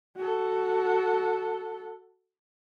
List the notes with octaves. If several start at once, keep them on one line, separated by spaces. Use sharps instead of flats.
F#4 A4